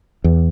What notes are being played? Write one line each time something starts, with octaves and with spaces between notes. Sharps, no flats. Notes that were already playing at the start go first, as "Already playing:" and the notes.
E2